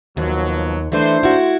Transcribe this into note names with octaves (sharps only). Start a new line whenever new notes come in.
D#2 B2 F3 F#3
E3 A3 D4 C5
E4 F#4